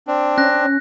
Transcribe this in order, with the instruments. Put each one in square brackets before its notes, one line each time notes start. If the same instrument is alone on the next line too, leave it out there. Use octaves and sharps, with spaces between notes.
[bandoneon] C4 D4
[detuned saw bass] C#4 [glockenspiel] F#6 A#6